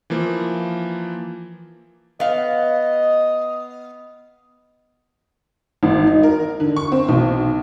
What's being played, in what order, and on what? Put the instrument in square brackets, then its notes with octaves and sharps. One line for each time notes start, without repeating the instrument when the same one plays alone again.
[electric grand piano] E3 F3 A#3
[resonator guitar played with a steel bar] B3 F5 [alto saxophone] D#5
[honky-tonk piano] G#1
D#4
A#4
D3
C#6
C4
B1